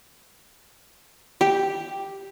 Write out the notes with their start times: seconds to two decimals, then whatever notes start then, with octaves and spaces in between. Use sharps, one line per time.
1.41 G4